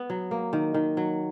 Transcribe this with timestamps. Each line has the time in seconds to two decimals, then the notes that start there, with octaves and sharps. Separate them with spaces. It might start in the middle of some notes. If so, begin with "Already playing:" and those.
Already playing: B3
0.10 F#3
0.31 A#3
0.53 D#3
0.74 D#3
0.97 F#3